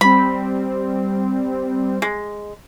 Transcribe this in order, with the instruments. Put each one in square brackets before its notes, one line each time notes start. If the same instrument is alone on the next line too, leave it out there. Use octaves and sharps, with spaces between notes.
[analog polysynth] G3 C4 [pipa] B5
[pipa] G#3